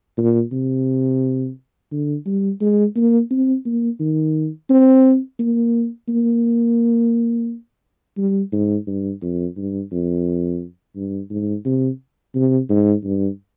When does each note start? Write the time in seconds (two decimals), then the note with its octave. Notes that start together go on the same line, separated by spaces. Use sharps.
0.18 A#2
0.52 C3
1.91 D3
2.26 G3
2.61 G#3
2.96 A#3
3.31 C4
3.66 A#3
4.00 D#3
4.70 C4
5.39 A#3
6.09 A#3
8.18 G3
8.52 G#2
8.87 G2
9.22 F2
9.57 G2
9.92 F2
10.96 G2
11.31 G#2
11.65 C3
12.35 C3
12.70 G#2
13.04 G2